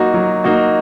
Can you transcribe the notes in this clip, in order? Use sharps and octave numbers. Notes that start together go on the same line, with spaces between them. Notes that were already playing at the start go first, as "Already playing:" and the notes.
Already playing: F#3 A#3 D#4 F#4
F#3
A#3 D#4 F#4